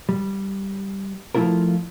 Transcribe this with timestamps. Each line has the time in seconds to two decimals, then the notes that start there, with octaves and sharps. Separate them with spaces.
0.09 G3
1.35 F3 A3 E4 F4 A#4